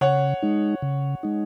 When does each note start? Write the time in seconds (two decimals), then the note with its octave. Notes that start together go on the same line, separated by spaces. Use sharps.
0.01 C#3 C#5 F#5
0.43 G#3 D#4
0.82 C#3
1.23 G#3 D#4